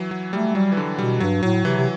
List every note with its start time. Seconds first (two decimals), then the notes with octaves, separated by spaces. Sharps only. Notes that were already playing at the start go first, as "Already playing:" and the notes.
Already playing: E3 F#3
0.11 F#3
0.33 G3 A3
0.55 F#3 G3
0.72 E3
0.77 D3
0.98 B2 G3
1.20 G2 F#3
1.43 A2 F#3
1.65 C3 E3
1.77 C3